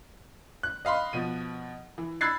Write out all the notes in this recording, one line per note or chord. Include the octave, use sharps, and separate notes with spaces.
F#6
D#5 F5 B5 C6
B2 F3 D#7
E3
B5 E6 F#6 G#6 A6 C7